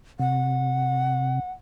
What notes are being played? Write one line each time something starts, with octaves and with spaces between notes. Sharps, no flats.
C3 F#5